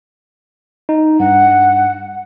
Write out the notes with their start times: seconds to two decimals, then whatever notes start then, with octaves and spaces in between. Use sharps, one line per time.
0.89 D#4
1.20 G2 F#5